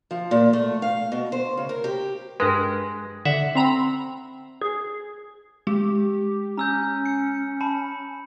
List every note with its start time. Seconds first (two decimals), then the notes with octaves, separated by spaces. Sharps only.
0.11 F3
0.31 A#2
0.53 A3
0.82 F5
1.12 B2
1.32 C5
1.57 C#3
1.69 A#4
1.84 G4
2.40 G2 G#3 A#4 B4
3.25 D3 E5 F#5
3.55 C4 A#5 B5
4.61 G#4
5.67 G#3 G4
6.57 C#4 A#5 E6 G6
7.06 C#7
7.61 A5 B5 C#7